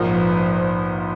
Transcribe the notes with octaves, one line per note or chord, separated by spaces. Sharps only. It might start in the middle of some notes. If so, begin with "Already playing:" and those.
Already playing: A#1 G#2 F3 A#4
B4
C5